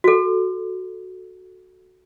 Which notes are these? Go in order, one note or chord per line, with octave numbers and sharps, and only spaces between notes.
F#4 A4